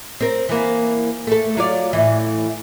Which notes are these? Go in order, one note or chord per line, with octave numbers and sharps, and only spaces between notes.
C4 A#4
E3 A#3
A3 A4
F#3 F4 D5
A2 E3